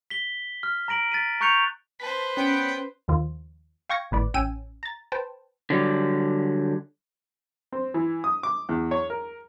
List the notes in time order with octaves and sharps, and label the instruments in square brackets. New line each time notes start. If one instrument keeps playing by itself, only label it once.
[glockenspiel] B6 G7
F6
A#5 A#6 D7 F#7
A6 B6 D#7
A#5 C#6 F#6 G6 C#7 F7
[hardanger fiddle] B4 C5 [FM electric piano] A5 B6
[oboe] B3 [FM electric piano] C#4 [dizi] G5
[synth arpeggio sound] D#2 D#3 F3 F4
F5 G5 C#6 G#6 A#6 C#7
G#1 A2 B4 D5
A1 C#4 G5 G#5 E6 D#7
A#5 A6
B4 C5 G5 A5
[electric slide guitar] D3 F#3 G3
[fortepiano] C4
E3
D#6
D6
E2
C#5
A#4